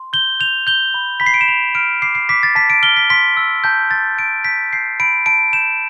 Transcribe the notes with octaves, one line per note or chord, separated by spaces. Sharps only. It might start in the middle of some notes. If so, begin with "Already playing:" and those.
Already playing: C6
G6 G7
G6 F7
G6 G7
B5
B5 B6
C7
D7
E7
B5 F7
F6 D7
D6 C7
C7
D6 B6
A6
A5 B6
D7
F6 G7
B6
C6 B6
E6
A5 G6
C6 A6
G6 D7
G6 B6
G6 C7
B5 D7
A5 D7
G6 E7